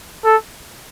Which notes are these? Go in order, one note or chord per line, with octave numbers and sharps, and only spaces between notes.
A4